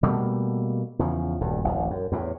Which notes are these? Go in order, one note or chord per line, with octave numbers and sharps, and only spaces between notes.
B2 G3 A3 A#3
E2 C#3 F3
D#1 D2 G2
D1 A1
F#2
E2 A2